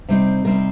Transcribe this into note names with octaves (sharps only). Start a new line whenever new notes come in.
C3 G3 C4 D#4
C3 G3 C4 D#4 A#4